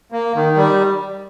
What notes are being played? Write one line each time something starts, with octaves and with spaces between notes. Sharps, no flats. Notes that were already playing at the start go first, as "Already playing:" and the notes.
A#3
D#3
G3